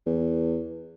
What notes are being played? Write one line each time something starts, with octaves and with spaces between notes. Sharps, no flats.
E2